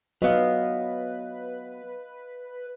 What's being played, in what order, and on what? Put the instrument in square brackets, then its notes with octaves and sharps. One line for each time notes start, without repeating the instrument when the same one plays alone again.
[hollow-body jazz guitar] F#3 B3 [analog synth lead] B4 [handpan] D#5 F5